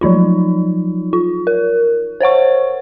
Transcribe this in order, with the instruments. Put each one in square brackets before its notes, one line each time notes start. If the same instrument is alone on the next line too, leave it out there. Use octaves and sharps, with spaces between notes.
[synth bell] F3 F#3 D#4 F4
F4
A#4
C5 C#5 F#5 C#6